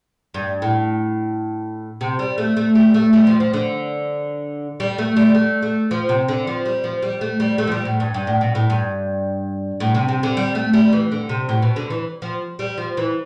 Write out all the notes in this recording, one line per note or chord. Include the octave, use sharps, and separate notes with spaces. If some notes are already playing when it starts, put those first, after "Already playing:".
G2
A2
C3
G3
A3
A3
G3
A3
G3
F3
F3
D3
G3
A3
G3
A3
A3
F3
C3
D3
F3
G3
F3
G3
A3
G3
A3
F3
G3
A2
G2
G2
A2
B2
A2
G2
A2
C3
C3
D3
G3
A3
G3
E3
D3
C3
A2
B2
D3
E3
F3
G3
F3
E3